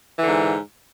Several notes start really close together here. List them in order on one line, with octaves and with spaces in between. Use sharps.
E3 D3 G#2